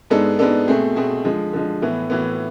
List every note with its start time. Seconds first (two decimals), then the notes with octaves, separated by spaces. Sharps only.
0.10 G#2 G#3 B3 D4 A4
0.39 G#2 G#3 B3 D4 A4
0.68 B2 A3 C4 G#4
0.96 B2 A3 C4 G#4
1.24 D3 F3 G#3
1.53 D3 F3 G#3
1.82 A2 E3 B3
2.10 A2 E3 B3